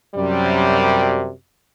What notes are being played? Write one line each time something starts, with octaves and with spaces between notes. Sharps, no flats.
F#2 C3 G3